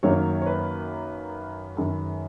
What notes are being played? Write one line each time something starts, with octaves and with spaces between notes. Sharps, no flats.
F#2 D#3 F#3 A#3 C#5
C#5
B4
F#2 D#3 G#3